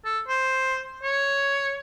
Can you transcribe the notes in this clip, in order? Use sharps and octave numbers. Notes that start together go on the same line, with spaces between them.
A4
C5
C#5